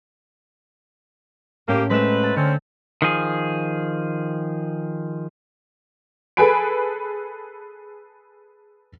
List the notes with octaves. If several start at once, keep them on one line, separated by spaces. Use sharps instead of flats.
A2 A#3 C#4 G4
F#3 G#3 A3 C4 B4 E7
A5
D3 C4 C#4
D#3 F3 G#4
G#4 A4 B4 G#5 B5 D7